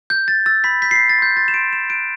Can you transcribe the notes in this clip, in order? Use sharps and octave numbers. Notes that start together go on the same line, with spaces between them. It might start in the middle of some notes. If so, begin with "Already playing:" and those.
G6
G6 A6
E6 A6
B5 B6
G6 B6
C7
G6 B6
A6
C6 G6
C6 A6
E7
C6 D7
C6 E7
F#6 D7